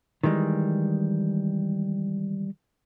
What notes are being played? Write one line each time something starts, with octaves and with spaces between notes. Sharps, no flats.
D#3 E3 G3 G#3